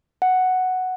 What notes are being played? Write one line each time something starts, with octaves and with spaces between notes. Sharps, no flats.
F#5